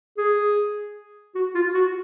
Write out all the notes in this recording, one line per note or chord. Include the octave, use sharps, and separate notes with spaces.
G#4
F#4
F4
F#4